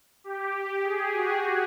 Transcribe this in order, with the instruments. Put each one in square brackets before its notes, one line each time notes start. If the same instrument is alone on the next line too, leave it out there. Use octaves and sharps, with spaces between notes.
[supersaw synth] G4
G#4
F#4